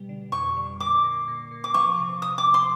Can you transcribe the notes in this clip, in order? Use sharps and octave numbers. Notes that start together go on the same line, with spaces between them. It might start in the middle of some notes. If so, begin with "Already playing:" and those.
Already playing: B2 G3
D3
F2 C#6
D3
A#2 D6
A#2
A#2
A#2
D6
F3 C#6
C3
F3 D#6
D6
D2
C6